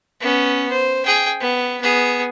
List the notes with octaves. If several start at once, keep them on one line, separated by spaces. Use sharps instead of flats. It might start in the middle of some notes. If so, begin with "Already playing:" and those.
B3 C#4
C5
G#4 G5
B3
B3 G#4